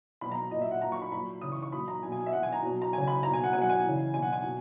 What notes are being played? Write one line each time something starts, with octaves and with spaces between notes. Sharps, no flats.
B2 F#3 B5
A#5
A#2 F#3 D#5
E5
F#5
A#2 F#3 A#5
C#6
B5
A#2 F#3 B5
C#3 E3 D#6
C#6
C#6
A#2 F#3 B5
A#5
B2 F#3 G#5
G#5
E5
B2 F#3 F#5
G#5
A#5
B2 F#3
A#5
C#3 F#3 G#5
B5
B2 F#3 A#5
G#5
F#5
B2 F#3 G#5
F#5
G#5
E3
C#3
B2 F#3 G#5
F#5
G#5
B2